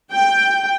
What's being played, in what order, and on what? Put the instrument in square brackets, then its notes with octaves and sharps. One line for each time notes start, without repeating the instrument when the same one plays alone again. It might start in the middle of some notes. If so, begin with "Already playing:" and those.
[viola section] G5